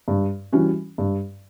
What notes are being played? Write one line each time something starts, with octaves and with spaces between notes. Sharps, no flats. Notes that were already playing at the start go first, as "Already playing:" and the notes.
G2
E3 G3 C#4 F#4
G2